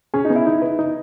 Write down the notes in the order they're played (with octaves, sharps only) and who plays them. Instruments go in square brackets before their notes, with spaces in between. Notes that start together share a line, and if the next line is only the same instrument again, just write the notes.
[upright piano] C#4 [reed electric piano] G#4
[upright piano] D#4
[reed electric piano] B3
[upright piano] E4
[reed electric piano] D#4
B4
D#4